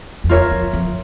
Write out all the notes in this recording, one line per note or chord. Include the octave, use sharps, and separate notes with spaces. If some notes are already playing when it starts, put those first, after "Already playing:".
F2
E2 F4 A#4 C#5 E5
F2
F2